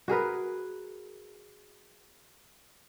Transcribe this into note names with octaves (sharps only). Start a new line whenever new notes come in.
F#4 G#4 A#4 B4